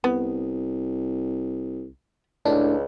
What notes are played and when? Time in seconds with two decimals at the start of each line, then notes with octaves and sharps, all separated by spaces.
0.04 C2 B3
2.45 C#2 A2 D4